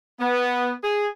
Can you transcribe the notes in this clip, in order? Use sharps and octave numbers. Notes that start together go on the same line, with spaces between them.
B3
G#4